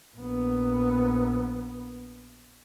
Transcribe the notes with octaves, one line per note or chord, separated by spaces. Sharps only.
A#1 B3